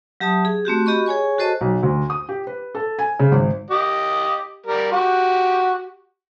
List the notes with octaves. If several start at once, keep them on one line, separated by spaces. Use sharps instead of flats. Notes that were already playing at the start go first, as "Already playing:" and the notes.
F#3 G4 E5 A5 D#6
G#4
A3 C4 F#4 G4
F#4 G4 D#5 B5 C#6
G#4 C#5 G#5 C#6
F#4 A4 C5 D#5 A5
B1
D2
D#6
G4
B4
A4
G#5
C#3
G#1
G4 D#5
G3 A#4
F#4 G4